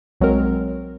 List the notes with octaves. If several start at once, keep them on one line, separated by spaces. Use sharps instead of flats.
B1 F#3 G#3 C4 A#4